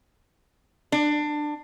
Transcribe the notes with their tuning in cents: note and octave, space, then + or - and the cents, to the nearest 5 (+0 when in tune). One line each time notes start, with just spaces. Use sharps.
D4 +20